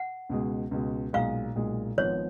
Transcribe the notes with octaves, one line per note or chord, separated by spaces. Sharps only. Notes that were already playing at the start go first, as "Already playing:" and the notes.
Already playing: F#5
C#2 B2 G#3
C#2 B2 G#3
B1 A#2 G#3 F5
B1 A#2 G#3
G#1 G#2 F3 B3 C#5